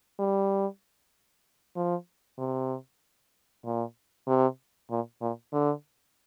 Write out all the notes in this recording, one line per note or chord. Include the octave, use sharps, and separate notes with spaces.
G3
F3
C3
A#2
C3
A#2
A#2
D3